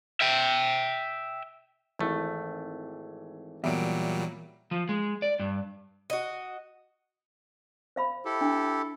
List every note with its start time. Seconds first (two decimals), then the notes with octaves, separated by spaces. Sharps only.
0.21 E5 G5
1.99 G#1 E3 A3
3.64 E2 A#2 F#3 G3 E5 D7
4.71 F3
4.89 G#3
5.22 D5
5.39 G2
6.10 F#4 D#5
7.96 C5 F5 B5
8.25 E4 G4 A4
8.41 D4